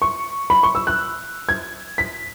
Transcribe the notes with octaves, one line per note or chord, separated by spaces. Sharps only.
C#6
B5
C#6
E6
F#6
G#6
B6